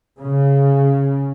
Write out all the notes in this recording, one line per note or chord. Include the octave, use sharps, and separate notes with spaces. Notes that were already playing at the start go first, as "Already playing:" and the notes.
C#3